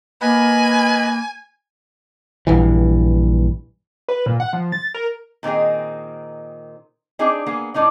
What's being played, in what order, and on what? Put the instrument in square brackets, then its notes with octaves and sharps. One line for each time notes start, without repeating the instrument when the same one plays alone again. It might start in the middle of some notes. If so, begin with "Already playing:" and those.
[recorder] A#3 [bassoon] B4 [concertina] D#5 B5 [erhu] G#5
[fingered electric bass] A#1 G2 E3
[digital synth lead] B4
A#2
F#5
F3
A6
A#4
[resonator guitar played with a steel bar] A#2 D#3 C4 D#4 G#4
C4 D4 D#4 G#4 D5
A#3 B3 G#4
A2 D4 D#4 D5